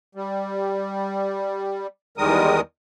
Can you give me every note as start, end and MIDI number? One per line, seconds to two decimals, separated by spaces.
0.15 1.87 55
2.18 2.61 40
2.18 2.61 51
2.18 2.61 55
2.18 2.61 56
2.18 2.61 70
2.18 2.61 87